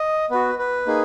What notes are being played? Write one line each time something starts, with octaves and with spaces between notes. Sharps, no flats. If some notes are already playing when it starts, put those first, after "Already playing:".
Already playing: D#5
B3 F#4 B4
B4
A#3 D#4 G#4